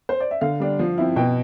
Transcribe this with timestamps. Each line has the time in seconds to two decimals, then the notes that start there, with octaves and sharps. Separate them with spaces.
0.09 C5
0.20 D5
0.31 E5
0.41 D3 F5
0.60 G3 D4
0.79 F3
0.98 C4 E4
1.16 B2 G5